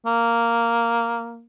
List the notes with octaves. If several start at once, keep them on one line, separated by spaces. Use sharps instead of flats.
A#3